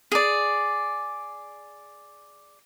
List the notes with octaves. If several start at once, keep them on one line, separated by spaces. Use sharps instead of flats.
G#4 D5